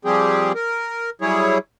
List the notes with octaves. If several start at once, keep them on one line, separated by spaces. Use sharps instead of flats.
F3 G3 C4 G4 G#4
A#4
F#3 G3 E4 G#4 C#5